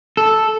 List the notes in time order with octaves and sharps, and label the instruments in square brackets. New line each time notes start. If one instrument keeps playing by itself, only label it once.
[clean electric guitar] A4